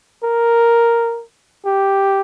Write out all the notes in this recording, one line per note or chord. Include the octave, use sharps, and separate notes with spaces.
A#4
G4